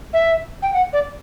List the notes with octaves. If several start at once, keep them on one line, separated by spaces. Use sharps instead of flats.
E5
G5
F#5
D5